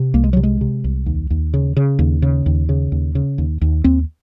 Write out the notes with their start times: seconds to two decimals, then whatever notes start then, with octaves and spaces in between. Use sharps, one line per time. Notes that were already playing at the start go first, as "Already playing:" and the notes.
Already playing: C3
0.14 C2 A#3
0.24 G#3
0.33 C3 F#3
0.43 G#3
0.61 C3
0.84 C2
1.06 D#2
1.30 D#2
1.54 C#3
1.77 C#3
1.99 D#2
2.22 C#3
2.46 D#2
2.69 C#3
2.92 D#2
3.15 C#3
3.38 D#2
3.61 D#2
3.84 D#2 C4